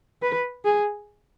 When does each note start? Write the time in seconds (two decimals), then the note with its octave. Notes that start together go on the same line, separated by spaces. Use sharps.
0.22 B4
0.65 G#4